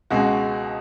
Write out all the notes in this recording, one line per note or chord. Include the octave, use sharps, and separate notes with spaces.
C#2 B2 G#3 F#4